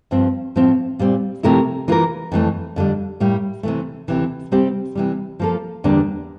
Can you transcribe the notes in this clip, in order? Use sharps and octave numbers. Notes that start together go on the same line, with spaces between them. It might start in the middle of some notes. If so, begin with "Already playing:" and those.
G2 F3 C4
A2 F3 C4 F4
A#2 G3 C4
C3 F3 A3 E4 A#4
E3 A#3 F4 A#4
F2 E3 A3
F2 D3 G3
A2 G3 A#3
C3 E3 A3
D2 C3 E3
C3 G3 C4 G4
C3 E3 G3
F3 A#3 F4 A4
E2 D3 G3 A#3 D4